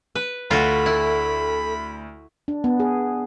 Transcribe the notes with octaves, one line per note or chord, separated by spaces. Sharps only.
B4
D2 F4 F#4 A4 B5
E4
D4
B3
G#4